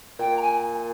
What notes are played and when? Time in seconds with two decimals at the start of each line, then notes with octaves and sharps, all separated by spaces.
0.19 A#2 G5
0.36 A#5
0.41 G#5